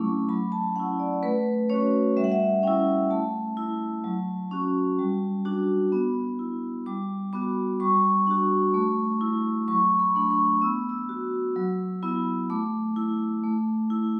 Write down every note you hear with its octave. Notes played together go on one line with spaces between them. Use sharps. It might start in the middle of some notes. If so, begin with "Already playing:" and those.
Already playing: F#3 A3 C#4 E4 D6
F#3 B5
A5
C#4 E4 F#5
D5
A3 B4
C#4 F#4 C#5
G3 E5
F#5
E5
C#4 E4 G5
A3 A5
E4
F#3
C#4 F#4
G3
D4 F#4
B3
E4
G3 D6
B3 F#4 D6
G3 C#6
D4 F#4
A3
E4
F#3 C#6
B5
A3 D4
C#6
B3 E6
E6
F#4
F#3
B3 E4
A3 D6
E4
A3
E4